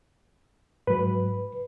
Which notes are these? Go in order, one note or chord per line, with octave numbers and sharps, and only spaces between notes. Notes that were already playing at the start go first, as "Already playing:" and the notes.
G#2 F#3 B4